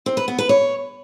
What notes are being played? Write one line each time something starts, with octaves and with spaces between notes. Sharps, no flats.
C4
B4
B3
B4
C#5